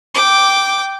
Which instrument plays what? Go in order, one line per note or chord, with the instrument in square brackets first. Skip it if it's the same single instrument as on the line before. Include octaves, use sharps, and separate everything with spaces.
[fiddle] G5 D6